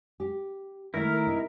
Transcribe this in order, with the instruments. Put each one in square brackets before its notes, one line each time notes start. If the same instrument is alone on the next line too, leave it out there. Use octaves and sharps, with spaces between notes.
[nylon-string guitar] G4
[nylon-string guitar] D#3 A3 [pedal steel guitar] E4 [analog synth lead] A#4
[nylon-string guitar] C3 D#4